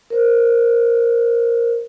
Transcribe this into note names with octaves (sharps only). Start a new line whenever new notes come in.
A#4 C5